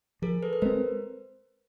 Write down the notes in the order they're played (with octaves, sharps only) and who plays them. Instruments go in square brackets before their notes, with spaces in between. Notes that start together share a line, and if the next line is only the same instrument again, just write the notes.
[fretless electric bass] F3 [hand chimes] G#4 A#4
[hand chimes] A4 B4
B4
[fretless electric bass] G#3 C4 [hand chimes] A#4 C5